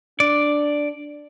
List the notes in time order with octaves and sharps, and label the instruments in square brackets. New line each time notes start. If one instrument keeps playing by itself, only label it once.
[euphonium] D4 [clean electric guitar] D5